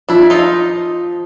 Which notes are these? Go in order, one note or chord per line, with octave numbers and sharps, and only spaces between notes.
F3 D4 E4
D#4 F4